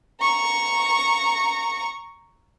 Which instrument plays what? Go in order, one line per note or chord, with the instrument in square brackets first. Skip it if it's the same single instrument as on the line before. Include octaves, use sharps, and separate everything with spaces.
[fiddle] A#5 C#6